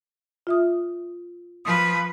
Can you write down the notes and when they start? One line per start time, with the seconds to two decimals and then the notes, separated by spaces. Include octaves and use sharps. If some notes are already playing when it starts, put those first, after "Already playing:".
0.47 F4 E5 D#6
1.65 F3 B4 D#6